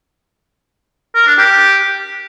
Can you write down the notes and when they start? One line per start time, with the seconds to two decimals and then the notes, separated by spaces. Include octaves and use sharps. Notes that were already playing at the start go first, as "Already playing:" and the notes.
1.15 A#4
1.27 D4
1.38 G4